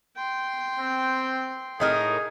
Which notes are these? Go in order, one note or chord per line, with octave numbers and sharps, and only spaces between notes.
G5 C6
C4
A2 D#4 G#4 A#4